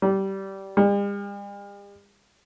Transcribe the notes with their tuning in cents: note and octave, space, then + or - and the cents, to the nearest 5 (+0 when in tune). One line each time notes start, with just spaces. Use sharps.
G3 -20
G3 +45